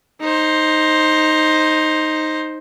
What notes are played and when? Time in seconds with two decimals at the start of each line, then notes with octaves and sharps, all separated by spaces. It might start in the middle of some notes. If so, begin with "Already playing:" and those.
0.21 D#4 C5